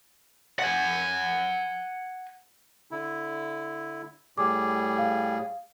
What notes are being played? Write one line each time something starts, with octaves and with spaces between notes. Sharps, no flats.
F#5 G#5
D3 E4
A2 G3 G#4 D6
F5